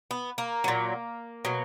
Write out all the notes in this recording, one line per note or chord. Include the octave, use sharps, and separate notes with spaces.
B3
A#3
A#2 F#3
B2 F#3